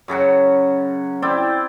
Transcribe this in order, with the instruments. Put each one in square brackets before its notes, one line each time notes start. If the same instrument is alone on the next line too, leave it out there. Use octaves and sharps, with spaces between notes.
[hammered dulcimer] F#2 C#3 F#3 F#5
C4 E4 D5 G5